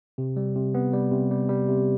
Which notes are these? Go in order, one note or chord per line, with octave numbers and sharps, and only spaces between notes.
C3
G3
C3
B3
G3
C3
G3
G3
C3